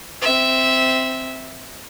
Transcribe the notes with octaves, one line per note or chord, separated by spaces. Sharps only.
C4 E5